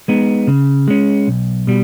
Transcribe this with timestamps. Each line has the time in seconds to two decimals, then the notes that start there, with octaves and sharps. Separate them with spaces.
0.08 G#3 B3 D#4
0.47 C#3
0.88 G#3 C#4
1.28 B1
1.67 B2 G3